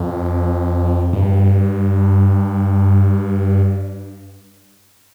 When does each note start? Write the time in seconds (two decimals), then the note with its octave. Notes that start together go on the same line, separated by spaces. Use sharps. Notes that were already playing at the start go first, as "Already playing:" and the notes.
Already playing: F2
1.13 G2